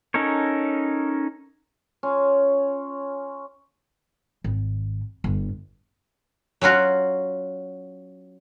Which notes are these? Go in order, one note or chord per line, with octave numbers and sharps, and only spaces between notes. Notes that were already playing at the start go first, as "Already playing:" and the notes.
C#4 D#4 A4 A#4 C#5
C#4 F4
G#1
G1 D3
F#3 C#4 F4 F#4